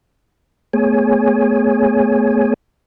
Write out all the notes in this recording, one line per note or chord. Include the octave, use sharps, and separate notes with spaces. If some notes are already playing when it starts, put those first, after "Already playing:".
A3 B3 G#4 C#5 G#5